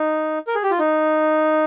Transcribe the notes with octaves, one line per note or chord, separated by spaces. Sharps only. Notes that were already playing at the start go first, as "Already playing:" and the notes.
Already playing: D#4
A#4
G#4
G4
F4
D#4